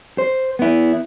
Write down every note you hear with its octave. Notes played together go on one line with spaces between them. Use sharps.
C5
B3 E4